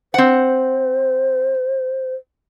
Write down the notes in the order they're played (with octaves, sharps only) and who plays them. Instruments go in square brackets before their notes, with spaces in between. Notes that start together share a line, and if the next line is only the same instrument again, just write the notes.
[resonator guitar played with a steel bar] C4 F#5 [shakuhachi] C5